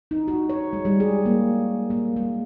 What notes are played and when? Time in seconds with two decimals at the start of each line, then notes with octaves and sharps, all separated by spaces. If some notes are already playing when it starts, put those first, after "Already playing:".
0.11 D#4
0.28 F#4
0.49 C#5
0.73 G#3
0.85 G3
1.00 G#4
1.26 A#3
1.90 A#3
2.16 G#3